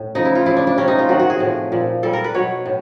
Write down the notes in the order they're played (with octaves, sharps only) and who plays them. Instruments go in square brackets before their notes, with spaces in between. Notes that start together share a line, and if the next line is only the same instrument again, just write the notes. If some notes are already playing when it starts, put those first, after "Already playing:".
Already playing: [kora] A2
C#3 F3 D#4
E4
F4
C#3 F3 E4
D4
D4
C3 F3 C#4
D#4
F4
C3 D#3 F#3 F#4
F#4
G#4
A2 F3
A#2 F3
A#2 G3 A4
A#4
B4
B2 F#3 C#5
A2